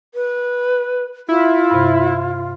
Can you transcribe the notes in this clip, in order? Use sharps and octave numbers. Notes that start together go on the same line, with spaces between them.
B4
E4 F4
G2 C3